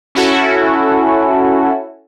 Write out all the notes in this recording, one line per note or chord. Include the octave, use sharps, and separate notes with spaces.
C#4 E4 F#4 A4